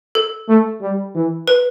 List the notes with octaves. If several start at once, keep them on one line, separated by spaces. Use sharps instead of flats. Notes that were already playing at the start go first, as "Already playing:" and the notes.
A4
A3
G3
E3
B4